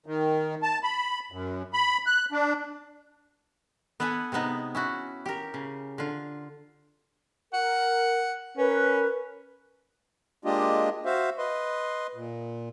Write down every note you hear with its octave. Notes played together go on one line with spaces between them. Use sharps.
D#3
A5
B5
F#2
B5
F#6
D4
B3 A4 B4 F#5 G#5
C3 G#3 B3 D#4
C#4 E4 F#4
G4 A#4
C#3
D3 F4
A#4 F#5
C#4 A#4 B4
G#3 A#3 D4 F4 G4 D#5
F#4 C5 E5 F5
B4 D#5 C6
A#2